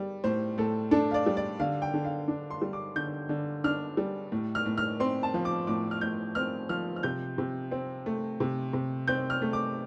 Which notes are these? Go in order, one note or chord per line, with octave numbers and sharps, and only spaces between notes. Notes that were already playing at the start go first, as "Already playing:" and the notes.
Already playing: G3
A2 C5
A2 A4
D4 A4
F5
D5
G3
D5
D3 F5
G5
D3
F5
D4
C6
G3
D6
D3 G6
D3
D4 F6
G3
A2
F6
A2
F6
C4 C6
A5
F3
D6
A2 D6
F6
A2 G6
C4 F6
F3 F6
F6
C3 G6
C3
C4
A3
C3
C3
C4 G6
F6
A3
D6